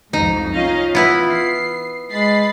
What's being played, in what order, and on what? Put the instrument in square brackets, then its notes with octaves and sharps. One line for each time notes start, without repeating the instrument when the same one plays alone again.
[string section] C2 F2 G#2 [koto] D#4
[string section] C#4 D#5 F5 [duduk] F4
[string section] E3 [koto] B3 E4 B4
[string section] C7
[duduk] G#3 [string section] B5 A6 C7